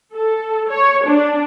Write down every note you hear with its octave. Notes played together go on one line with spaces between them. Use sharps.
A4
C#5
D4